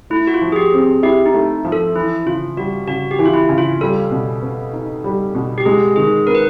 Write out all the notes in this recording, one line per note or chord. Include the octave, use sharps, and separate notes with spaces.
A3 E4
F#4
F4
F3
G#4
G4
C4
G#4
E4 G4
D#4
A3
F3
A4
E3 E4
C#3 F4
G3 F#4
C#3 F#4
G4
E3
F4
E4
C#3
F4
G3 A4
B2
B3
D#4
G3
B2
G4
G#3 G#4
D#3 G#4
B3 A#4
B4